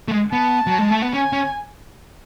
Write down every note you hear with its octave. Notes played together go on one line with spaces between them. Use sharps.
A3
G#3
B3 A5
F#3
G#3
A3
B3
C#4 G#5
C#4